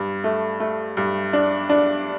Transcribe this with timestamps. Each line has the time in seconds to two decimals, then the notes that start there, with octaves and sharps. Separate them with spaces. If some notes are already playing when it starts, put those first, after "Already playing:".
Already playing: G2
0.24 A3
0.60 A3
0.97 G2
1.33 D4
1.70 D4